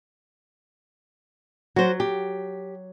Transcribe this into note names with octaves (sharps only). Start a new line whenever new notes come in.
F#3 F#4 C5
G4